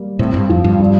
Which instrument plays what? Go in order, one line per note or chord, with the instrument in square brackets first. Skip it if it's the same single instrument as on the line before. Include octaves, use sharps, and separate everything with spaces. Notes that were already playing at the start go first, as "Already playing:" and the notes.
Already playing: [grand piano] G3 A#3
[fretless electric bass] A2 [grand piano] C4
[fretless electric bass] G2
[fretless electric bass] F2 [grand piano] F3
[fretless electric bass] G2
[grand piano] G3